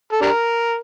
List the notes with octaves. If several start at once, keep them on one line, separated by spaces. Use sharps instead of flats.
A4
D4 G4 A#4